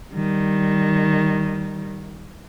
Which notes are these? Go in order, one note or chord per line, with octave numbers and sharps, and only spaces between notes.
D#3 G3